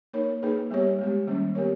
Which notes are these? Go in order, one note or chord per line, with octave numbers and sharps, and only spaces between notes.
A#3 D#4 A#4 C#5
A#3 D#4 G#4 B4
G3 B3 G4 C#5
G#3 B3 G4
D#3 G3 A#3 C#4
B3 G4 A#4 C#5